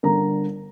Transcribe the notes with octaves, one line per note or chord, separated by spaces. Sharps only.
G1 G2 D3 A#4 A#5